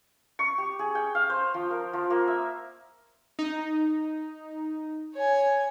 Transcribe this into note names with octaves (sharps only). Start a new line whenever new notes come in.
C#6
G4
G#4
G5
F5
C5
F3
A#4
F3
A#3
E5
D#4
C#5 G#5